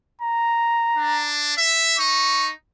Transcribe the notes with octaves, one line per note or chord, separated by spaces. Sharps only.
A#5
D4
E5
D#4 C#6